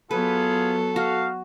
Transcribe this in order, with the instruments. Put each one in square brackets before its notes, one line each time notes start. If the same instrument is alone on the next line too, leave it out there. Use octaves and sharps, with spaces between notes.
[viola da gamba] F#3 B3 [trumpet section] F4 G#4 [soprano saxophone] A4 [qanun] B4
[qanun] F#4 [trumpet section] F5